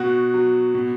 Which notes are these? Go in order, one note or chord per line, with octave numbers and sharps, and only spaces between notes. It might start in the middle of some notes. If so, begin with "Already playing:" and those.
Already playing: B2 F#4
F#3
B2